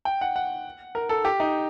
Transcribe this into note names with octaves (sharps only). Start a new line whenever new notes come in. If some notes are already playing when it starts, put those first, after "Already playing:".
G5
F#5
F#5
A#4
A4
G4
D#4